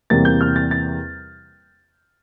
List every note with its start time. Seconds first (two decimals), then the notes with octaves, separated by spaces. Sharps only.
0.10 E2 C3 G3 A#3 A6
0.25 G6
0.41 F6
0.56 A6
0.71 A6